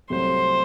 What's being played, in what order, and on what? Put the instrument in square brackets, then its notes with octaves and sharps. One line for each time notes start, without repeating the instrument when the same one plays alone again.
[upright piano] C2 C3 F#3 A3 [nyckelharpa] C5